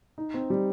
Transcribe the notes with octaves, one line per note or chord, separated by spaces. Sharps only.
D#4
C4
G3